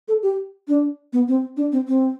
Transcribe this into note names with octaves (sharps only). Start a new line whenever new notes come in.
A4
G4
D4
B3
C4
D4
C4
C4